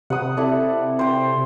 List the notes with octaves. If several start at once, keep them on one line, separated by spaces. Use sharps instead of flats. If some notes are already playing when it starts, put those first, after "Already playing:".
C3 F#5 D#6
E4 A4 D5
C5 G5